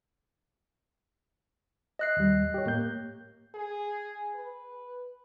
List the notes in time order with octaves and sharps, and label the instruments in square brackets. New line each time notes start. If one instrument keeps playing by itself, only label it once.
[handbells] D#5 F#6 C7
[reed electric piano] D#2 G3
G4 C#5
A2 A#3 G6
[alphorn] G#4
B4